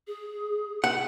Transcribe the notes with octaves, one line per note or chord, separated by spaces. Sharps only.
G#4
F#5